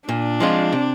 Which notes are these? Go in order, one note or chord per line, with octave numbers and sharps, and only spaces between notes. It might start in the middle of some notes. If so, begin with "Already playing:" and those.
A#2 D4
F3 G#3 C4 F4
C3